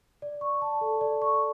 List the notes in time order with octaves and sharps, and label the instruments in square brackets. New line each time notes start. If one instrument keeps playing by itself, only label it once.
[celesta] D5
C#6
A5
A4
D5
C#6